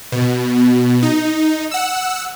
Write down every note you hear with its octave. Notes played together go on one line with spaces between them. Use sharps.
B2
D#4
F#5 E6